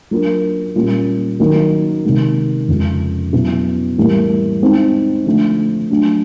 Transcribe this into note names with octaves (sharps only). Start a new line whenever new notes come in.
F#3 A#3 D4 F4 A#4
A#2 G3 A#3 C#4 F4
D#3 F#3 A#3
C3 D#3 G#3
F2 C#3 F3 G#3
B2 F#3 B3 E4
A2 E3 G3 A#3
G#3 C4 D#4
D3 F3 A3 D4
F#3 A3 D4